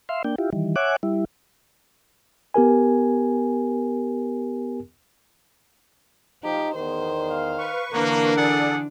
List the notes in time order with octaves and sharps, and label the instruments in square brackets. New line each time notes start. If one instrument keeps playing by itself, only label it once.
[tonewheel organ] E5 F5 C6
A#3 D4 G5
E4 F4 G4
D#3 E3 G3
C#5 E5 F#5 G#5 D6 F#6
G3 E4
[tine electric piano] B3 G4 A#4 G#5
[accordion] F3 [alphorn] D#4 [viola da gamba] G4
[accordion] E2 [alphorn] D#3 [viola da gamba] C5
[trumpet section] F5
[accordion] B4 C#6
[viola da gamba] D3 E3 D4 [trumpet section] A#3 [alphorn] A#4
[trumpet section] G#4 F#5 [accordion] A4 D5